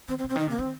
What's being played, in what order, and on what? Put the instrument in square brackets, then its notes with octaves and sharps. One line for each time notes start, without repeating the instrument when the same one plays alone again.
[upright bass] D#3 [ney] C4
[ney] C4
[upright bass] C3
[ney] C4
[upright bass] D#3 [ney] D#4
[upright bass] C3 [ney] A#3
[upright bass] D#3 [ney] C4